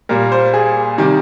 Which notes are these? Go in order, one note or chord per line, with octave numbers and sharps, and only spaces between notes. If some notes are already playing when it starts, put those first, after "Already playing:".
A#2 G3 A#3 A#4
C5
G#4
C3 D#3 G3